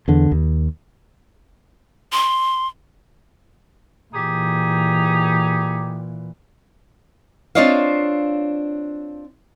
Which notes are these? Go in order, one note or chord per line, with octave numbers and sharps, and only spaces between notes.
E2 D3
D#2
C6
A#2 E3 D#4 G4 G#4
C4 D4 F4 C#5 D#5 F5